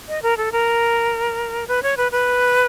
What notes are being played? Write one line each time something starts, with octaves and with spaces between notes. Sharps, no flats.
D#5
A#4
A4
A#4
B4
C#5
B4
B4